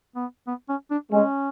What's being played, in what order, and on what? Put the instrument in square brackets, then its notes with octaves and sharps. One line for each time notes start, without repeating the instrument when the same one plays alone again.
[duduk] B3
B3
C#4
D4
[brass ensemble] G#3 [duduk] C#4